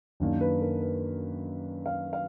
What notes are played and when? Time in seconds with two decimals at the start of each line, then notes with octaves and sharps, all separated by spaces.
0.20 F#2 D#3 A#3 D4
0.41 B4
0.62 A#4
0.83 B4
1.86 F5
2.13 F5